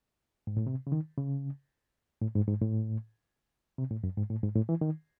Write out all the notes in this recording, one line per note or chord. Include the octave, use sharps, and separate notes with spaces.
G#2
A2
C3
C#3
D#3
C#3
A2
G#2
G#2
A2
C3
A2
F#2
G#2
A2
G#2
A2
E3
D#3